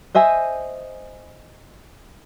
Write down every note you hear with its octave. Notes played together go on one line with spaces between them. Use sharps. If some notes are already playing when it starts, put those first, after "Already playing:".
C5 D#5 E5 G#5